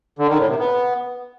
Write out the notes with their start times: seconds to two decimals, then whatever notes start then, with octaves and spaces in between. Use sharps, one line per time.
0.19 D3
0.29 D#3
0.39 A2
0.49 C3
0.59 B3